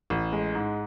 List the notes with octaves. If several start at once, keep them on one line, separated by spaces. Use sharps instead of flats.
A1
G#3
G#2